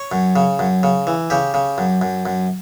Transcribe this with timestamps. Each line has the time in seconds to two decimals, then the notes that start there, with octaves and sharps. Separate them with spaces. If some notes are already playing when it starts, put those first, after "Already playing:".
Already playing: C#5
0.12 F#2
0.36 C#3
0.59 F#2
0.83 C#3
1.07 E3
1.30 C#3 G4
1.54 C#3
1.78 F#2
2.02 F#2
2.26 F#2